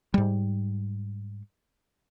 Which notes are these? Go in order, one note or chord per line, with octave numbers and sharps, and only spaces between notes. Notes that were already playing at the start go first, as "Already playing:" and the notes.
G#2 G3